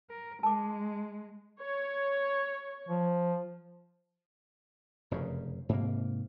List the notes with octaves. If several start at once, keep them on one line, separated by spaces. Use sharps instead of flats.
A#4
G#3 A5 D6
C#5
F3
F1 F#2 C#3
G#2 C3 A#3